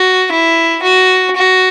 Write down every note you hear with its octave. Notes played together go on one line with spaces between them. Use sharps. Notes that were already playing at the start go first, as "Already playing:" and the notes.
Already playing: F#4
E4
F#4
F#4